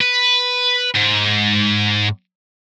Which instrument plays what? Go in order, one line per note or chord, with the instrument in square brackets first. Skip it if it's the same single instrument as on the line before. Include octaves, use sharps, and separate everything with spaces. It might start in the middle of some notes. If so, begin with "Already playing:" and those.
[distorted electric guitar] B4
G#2